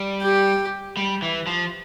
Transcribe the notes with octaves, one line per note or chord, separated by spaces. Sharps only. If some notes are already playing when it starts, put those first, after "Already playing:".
Already playing: G3
G4
G3
E3
F3